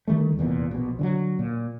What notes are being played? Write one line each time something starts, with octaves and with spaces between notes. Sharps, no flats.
D2 D#3 G3 A3
F1 E2 G2 A#2
A#1 B2
D3 E3 F#3
A#2